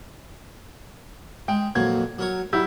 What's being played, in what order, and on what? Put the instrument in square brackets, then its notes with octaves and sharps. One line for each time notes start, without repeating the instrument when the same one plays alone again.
[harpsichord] G#3 [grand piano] G5
[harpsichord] F2 A#2 F#3 [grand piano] G#6
[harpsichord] F#3 A#4 C#5
[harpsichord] F#3 [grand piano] G3 E4 G6